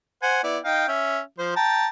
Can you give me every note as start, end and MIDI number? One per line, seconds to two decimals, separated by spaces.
0.22 0.41 72
0.22 0.41 78
0.22 0.41 80
0.44 0.58 59
0.44 0.58 64
0.44 0.58 74
0.64 0.86 63
0.64 0.86 77
0.64 0.86 79
0.88 1.19 61
0.88 1.19 76
1.39 1.53 53
1.39 1.53 72
1.56 1.87 79
1.56 1.87 81
1.56 1.87 82